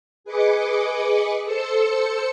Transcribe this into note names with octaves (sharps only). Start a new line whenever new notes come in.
G#4 B4 D#5 D6 C#7
A4 C5 E6 C#7